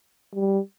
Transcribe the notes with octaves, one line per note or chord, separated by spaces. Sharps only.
G3